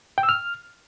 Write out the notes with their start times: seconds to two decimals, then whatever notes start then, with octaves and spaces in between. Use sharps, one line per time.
0.18 G5
0.23 E6
0.29 F6